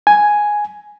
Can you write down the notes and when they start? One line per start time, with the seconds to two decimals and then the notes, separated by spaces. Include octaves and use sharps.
0.07 G#5